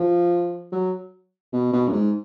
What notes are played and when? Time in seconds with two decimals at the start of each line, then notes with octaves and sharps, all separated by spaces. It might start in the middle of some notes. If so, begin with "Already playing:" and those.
Already playing: F3
0.72 F#3
1.53 B2
1.73 B2
1.88 F#2
1.93 G#2